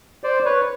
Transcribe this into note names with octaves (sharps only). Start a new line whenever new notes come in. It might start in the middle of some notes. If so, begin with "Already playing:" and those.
C5 D5
B4 C#5